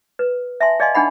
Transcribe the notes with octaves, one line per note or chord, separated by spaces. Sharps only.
B4
E5 G#5 A5 C6
G#4 D5 D#5 F5 G#5 C6
D4 D#4 G#4 F#5 B5